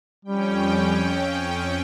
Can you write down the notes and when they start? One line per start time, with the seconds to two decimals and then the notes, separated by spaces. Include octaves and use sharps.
0.25 F2 G3 C#4 G5